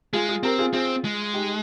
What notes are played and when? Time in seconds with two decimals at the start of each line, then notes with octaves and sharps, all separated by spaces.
0.13 G#3 F4 G#4
0.28 F4 G#4
0.43 C4 G4 A#4
0.58 F4 G#4
0.73 C4 F4 G#4
1.05 G#3
1.34 D#4 G4